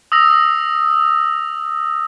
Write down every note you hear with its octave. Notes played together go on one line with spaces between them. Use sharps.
D#6 E6 A#6 F7